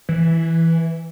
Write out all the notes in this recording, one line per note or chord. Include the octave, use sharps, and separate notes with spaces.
E3